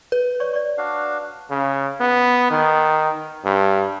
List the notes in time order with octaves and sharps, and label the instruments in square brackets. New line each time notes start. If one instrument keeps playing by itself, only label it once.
[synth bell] B4
[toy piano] C#5 D5 C#6
D5 C#6
[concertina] D4 F#4 F5
[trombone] C#3
B3
D#3
G2